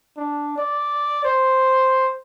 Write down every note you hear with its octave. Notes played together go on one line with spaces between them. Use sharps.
D4
D5
C5